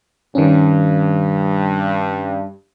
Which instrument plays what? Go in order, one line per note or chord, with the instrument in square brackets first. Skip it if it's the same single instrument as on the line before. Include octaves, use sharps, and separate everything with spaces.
[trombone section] G2 [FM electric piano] D#3 C#4